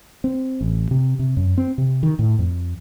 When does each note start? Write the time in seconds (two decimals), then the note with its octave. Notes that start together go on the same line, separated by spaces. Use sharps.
0.24 C4
0.61 A1
0.91 C3
1.19 C3
1.37 F#2
1.58 C4
1.78 C3
2.03 D#3
2.19 A2
2.39 F2